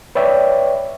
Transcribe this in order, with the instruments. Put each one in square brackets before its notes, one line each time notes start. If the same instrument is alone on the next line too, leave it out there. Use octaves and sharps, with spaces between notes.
[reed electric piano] B4 C#5 D5 E5 G5